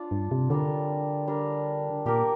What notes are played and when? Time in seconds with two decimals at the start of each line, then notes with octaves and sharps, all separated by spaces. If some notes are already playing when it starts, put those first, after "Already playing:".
Already playing: D4 F4 D5
0.11 G2
0.31 C3
0.50 D3 G3 D4 A#4
1.28 G3 D4 A#4
2.06 A#2 A#3 G4 A#4